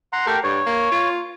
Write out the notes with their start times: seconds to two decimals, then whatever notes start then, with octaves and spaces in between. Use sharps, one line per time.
0.13 F#5 A#5 C6
0.27 A3 G4 A#4 G5
0.44 G2 C#5
0.66 A#3
0.91 F4